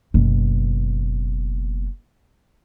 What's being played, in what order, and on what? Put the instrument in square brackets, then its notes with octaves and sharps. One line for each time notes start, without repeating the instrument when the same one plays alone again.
[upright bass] F#1 B2